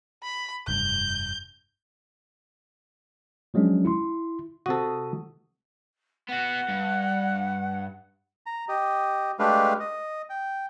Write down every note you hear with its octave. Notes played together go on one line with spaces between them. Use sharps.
B5
F1 G2 G6
F3 F#3 G#3 C#4 D4
E4 C6
C3 F#4 A4 D#6
B3 F#4 F#5
G2
A#5
G4 D#5
G#3 A3 D4 G4 B4 F5
D#5
G5